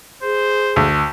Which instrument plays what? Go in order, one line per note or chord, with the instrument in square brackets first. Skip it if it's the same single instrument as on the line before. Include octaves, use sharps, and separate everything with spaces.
[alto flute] G#4 [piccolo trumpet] C5
[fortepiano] D2